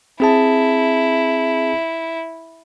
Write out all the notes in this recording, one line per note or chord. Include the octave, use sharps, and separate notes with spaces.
C4 E4 G#4 A5